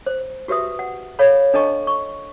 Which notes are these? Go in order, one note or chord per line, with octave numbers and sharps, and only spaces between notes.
C5
F#4 G4 B4 E5 D#6
F#5
A4 C#5 F5 B5
D4 A4 D#5 A5 C#6
C#6